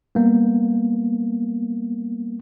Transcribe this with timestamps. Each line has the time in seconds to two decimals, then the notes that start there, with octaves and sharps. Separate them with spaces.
0.15 G3 A#3 B3